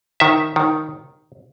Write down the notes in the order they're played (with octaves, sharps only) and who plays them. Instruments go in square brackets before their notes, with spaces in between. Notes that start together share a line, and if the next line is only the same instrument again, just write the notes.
[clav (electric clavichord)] D#3 E5
D#3